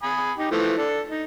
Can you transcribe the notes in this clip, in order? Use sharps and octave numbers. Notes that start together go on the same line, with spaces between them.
G#5 B5 D#6
D#4 G4
E3 F3 A3
D4 A4
D#4